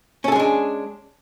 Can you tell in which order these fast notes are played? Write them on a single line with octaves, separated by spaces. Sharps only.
C#4 A4 G#4 G#3 D4